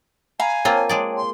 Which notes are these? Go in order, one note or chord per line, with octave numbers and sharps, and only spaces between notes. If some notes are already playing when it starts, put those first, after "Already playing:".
F5 G#5 A#5 B5
A#3 C4 F4 C#5 G5 A5
G#3 G#4 D5
C6